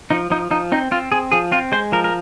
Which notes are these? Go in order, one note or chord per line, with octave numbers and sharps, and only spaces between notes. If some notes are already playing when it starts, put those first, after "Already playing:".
F3 D#4
F3 D#4
F3 D#4
C4 D#4
C4 F4
C4 G#4
F3 G#4
C4 F4
G#3 C5
F3 A#4
A#4